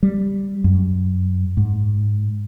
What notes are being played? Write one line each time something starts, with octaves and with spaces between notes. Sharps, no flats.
G3
F#2
G#2